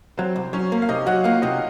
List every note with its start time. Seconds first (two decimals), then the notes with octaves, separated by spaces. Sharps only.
0.18 F#3 C4 C5
0.36 C2
0.53 F#3 C#4 C#5
0.72 A#3
0.82 F5
0.89 C3 D#4 D#5
1.06 F#3 F#4 F#5
1.24 A#3 F4 F5
1.42 C3 D#4 D#5